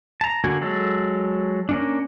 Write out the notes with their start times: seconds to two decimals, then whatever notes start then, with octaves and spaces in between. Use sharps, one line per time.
0.21 A5 A#5
0.44 D3 A#3 F#4 G#5
0.61 F#3 G#3 A4
1.69 A#3 C#4 D4